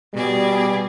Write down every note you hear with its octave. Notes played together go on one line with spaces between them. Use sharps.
B2 G3 G#4 D5